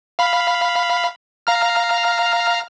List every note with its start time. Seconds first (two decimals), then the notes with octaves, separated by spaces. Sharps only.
0.19 F5 B5
1.47 F5 A#5 F6